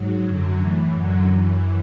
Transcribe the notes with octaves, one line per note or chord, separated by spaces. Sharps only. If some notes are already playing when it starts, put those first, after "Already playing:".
Already playing: G#2 F#3
F#2 D3 F#3
A2 E3
F#2 D3 F#3
F#2 E3